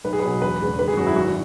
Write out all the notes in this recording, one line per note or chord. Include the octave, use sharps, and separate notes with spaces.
B1 B4
G#4
B4
B2 F#3
E1 B4
E2 C#3 G#3
G#1 B4
G#4
F#2 F#3 F#4
E4
G#1 F#4